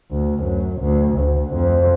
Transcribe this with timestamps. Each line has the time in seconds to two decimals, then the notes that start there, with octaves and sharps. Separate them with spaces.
0.12 D2
0.44 F#2
0.81 D2
1.19 D2
1.55 F2